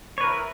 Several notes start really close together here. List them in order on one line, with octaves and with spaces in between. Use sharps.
C#5 B4 A#4 E4